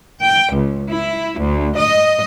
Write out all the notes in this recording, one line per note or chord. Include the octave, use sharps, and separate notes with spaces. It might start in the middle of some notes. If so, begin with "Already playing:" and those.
G5
C#2
E4
D2
D#5